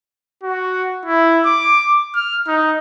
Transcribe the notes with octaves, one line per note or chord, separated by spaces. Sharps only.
F#4
E4
D6
F6
D#4